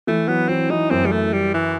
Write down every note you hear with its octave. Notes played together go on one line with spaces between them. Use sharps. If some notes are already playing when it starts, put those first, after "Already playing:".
E3 A3
F#3 B3
E3 C4
E3 D#4
F#2 C4
G3
A3
G3
E3